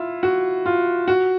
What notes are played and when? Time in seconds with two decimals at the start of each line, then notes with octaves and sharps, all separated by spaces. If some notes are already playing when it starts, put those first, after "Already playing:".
Already playing: E4 F4
0.23 F#4
0.66 F4
1.08 F#4